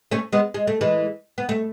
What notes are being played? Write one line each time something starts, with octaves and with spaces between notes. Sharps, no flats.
A3 C#4
G#3 B3
G#3
A3
E3 G#3
B3
A3